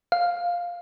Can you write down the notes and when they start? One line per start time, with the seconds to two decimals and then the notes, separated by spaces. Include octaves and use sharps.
0.12 F5